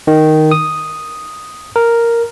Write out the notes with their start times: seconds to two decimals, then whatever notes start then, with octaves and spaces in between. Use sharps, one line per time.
0.07 D#3
0.51 D#6
1.76 A#4